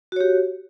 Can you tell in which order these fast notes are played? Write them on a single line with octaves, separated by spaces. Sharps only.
F#4 C#5 G4